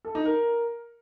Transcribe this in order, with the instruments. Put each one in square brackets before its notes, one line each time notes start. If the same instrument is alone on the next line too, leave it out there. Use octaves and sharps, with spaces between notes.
[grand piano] A4
D#4
A#4